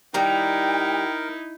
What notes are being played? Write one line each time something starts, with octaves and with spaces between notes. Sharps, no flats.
D#3 G3 D#4 E4 A#4 G5 A#5